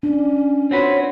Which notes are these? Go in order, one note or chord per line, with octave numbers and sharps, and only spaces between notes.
C#4 D4
C4 F4 F#4 B4 C#5